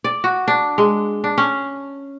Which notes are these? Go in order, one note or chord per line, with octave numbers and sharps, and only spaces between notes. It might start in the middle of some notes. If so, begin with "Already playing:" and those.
D5
F#4
D4
G#3
D4
C#4